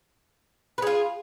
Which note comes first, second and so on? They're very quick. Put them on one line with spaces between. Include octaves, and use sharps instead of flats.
B4 G#4 F4